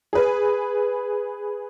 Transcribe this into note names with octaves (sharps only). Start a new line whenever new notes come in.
G#4 B4